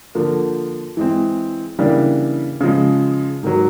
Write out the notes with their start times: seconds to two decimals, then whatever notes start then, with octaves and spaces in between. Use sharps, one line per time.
0.15 D3 F3 A#3
0.97 E3 G#3 C4
1.79 C#3 E3 G3 A#3 D4
2.61 C#3 F3 G#3
3.43 G#2 D#3 F#3